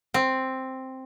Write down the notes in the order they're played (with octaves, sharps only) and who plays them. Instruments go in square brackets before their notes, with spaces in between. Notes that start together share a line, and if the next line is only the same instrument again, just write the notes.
[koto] C4